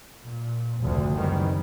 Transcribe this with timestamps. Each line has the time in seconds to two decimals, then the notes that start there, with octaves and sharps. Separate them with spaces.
0.25 A#2
0.81 F1 D2
1.18 F#1 D#3 E3 G3 C4